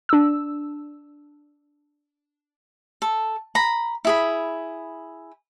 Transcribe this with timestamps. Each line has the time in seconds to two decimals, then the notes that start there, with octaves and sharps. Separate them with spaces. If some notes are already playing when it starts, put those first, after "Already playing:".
0.09 D4 E6
3.02 A4
3.55 A#5 B5
4.05 E4 G#4 B5